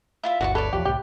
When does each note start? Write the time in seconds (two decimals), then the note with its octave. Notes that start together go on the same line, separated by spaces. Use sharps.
0.23 E4 F4 E5
0.41 G1 D2 E3 F#4 D5 C#6
0.55 A4 B4 C#5 D5
0.73 B1 E2 F3 G4
0.85 C2 A2 G4